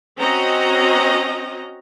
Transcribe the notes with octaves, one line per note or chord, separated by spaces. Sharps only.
C4 C#4 F#4 D#5 A#5